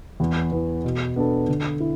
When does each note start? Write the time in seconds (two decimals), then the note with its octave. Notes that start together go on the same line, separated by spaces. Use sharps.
0.20 E2
0.52 E3 B3
0.84 B2
1.16 B3 D4 A4
1.48 D3
1.80 E4